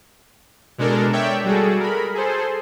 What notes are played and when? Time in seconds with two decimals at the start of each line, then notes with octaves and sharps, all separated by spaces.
0.78 B2 G#3 D4 A4 A#4
1.13 C#5 D5 E5 G5
1.45 G3 F#4 G#4 A4
1.80 A#4 B5
2.14 G#4 A4 C5